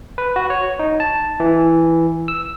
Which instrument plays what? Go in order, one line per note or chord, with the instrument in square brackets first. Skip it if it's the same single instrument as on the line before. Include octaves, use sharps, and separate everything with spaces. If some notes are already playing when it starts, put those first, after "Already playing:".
[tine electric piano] B4
F#4
C#5
D#4
A5
E3
E6